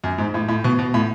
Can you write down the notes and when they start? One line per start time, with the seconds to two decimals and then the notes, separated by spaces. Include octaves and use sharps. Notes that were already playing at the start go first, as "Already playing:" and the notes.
0.04 F#2
0.18 G#2
0.34 A2
0.48 A2
0.64 B2
0.79 B2
0.94 A2